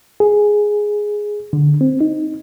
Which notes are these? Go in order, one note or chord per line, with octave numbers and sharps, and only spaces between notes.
G#4
D3
C4
D#4